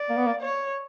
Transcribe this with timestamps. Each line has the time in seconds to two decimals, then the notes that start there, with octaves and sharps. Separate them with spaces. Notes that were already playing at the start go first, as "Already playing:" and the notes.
Already playing: D5
0.10 A#3
0.17 B3
0.26 A#3
0.41 C#5